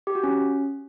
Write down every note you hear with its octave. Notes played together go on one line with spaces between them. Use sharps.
G4
F#4
C#4